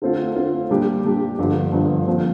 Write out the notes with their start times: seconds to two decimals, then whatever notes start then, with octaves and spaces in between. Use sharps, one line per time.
0.02 D3 A3 C4 F4
0.35 D3 A3 C4 F4
0.71 A#2 G3 D4 G4
1.04 A#2 G3 D4 G4
1.38 G1 G2 D3 F3
1.72 G1 G2 D3 F3
2.08 A#2 F3 C4